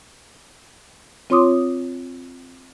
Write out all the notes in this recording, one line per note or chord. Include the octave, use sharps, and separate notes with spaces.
C4 F4 C#5 C6 D6 D#6